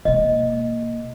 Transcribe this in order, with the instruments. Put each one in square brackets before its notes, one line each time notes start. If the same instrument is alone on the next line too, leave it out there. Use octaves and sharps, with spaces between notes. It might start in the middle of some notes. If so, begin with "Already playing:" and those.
[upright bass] B2 A#3 [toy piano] D#5